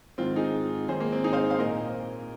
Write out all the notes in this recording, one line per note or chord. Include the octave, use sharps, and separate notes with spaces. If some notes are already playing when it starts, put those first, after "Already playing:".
G#2 D#3 C4 F4
D#4 G#4
G#2 D#3 G#4 C5
A#3
C4
D#4 G#4
C5 F5
C5 F5
A#2 A#4 D#5